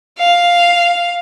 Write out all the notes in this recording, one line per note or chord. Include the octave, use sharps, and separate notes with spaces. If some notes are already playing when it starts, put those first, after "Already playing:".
F5